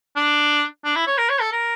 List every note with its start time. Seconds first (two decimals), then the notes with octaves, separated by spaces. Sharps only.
0.16 D4
0.84 D4
0.95 E4
1.07 C#5
1.18 A#4
1.29 C#5
1.41 A4
1.52 A#4